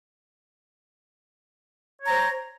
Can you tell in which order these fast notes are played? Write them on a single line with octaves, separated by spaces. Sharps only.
C#5 A#5 C5